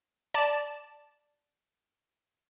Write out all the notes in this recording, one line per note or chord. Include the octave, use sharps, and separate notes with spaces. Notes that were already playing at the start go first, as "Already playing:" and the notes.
D5 A5